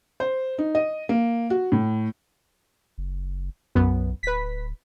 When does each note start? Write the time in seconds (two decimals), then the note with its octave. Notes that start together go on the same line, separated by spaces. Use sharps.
0.20 C5
0.58 D#4
0.75 D#5
1.09 A#3
1.50 F#4
1.72 A2
2.98 F#1
3.75 B1 F#2 B3
4.23 D1 B4 B6